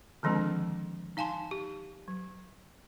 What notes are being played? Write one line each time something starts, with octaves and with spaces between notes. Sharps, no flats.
D3 D#3 F3 G#3 C4 D4
D#4 F5 G#5 A5 C6
G4
F#3